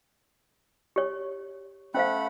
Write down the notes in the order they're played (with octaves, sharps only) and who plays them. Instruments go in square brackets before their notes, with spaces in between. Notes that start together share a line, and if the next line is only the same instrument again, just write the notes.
[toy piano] G4 C#5
[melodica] A3 F#5 B5 [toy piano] C#4 C5 F5